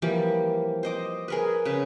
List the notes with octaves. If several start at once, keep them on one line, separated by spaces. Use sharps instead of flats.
E3 F3 G3 A#3
C5 D#5 D6
G#4 A#4 B4
C#3 B4